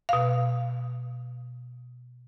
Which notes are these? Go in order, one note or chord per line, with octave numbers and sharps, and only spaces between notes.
B2 F5